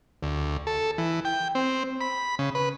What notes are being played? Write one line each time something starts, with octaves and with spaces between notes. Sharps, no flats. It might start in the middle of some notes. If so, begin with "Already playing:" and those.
D2
A4
E3
G5
C4
B5
C#3
B4